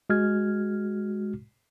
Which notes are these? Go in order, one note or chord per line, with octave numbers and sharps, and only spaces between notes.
G#3 F#4 F6 G#6